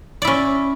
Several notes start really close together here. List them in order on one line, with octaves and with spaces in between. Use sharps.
D5 E4 C#4